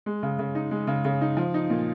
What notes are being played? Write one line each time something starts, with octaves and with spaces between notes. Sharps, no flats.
G#3
C#3
C#3
D#4
G#3
C#3
C#3
D#4
F3
D#4
A#2